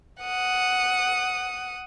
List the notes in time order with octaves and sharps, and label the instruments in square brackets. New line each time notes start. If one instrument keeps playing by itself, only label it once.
[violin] F#5 D#6